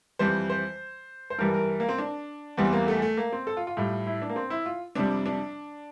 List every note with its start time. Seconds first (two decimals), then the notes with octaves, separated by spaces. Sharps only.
0.19 F2 E3 G3 C5
0.50 C5
1.30 C5
1.38 G2 E3 G3 A#4
1.54 A#4
1.80 A#3
1.89 C4
1.98 D4
2.58 E2 E3 G3 C4
2.73 A#3
2.88 A3
3.02 A3
3.17 A#3
3.33 C4
3.47 A4
3.57 F4
3.67 F4
3.77 A2 G3
4.07 E4
4.22 D4
4.30 A#3
4.36 C4
4.50 E4
4.66 F4
4.95 F2 C3 G3 D4
5.26 D4